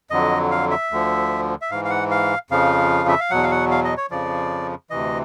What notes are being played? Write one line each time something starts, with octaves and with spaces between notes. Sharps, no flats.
F2 D3 F#3 D#5
F5
E5
D2 D3 F3
E5
G#2 E3 F5
F5
F#5
F5
F2 C#3 F3 F5
E5
F5
E2 B2 F#3 F#5
F5
F#5
F5
D#5
C#5
F2 C#3 F3 D5
D2 C3 E3 D#5